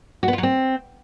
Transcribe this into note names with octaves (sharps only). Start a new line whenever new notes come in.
F#4
B3
F4
F#3
C4